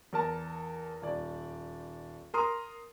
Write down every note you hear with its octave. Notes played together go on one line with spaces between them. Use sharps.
E2 A#4 A5
D#1 D5
A#4 A#5 C6 D#6